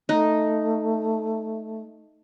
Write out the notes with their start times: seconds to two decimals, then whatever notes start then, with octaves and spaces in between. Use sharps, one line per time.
0.09 A3 D#4